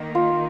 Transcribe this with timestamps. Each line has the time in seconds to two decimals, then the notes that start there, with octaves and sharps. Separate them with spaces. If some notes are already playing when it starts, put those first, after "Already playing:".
Already playing: D#3 A#3 D#4
0.15 F4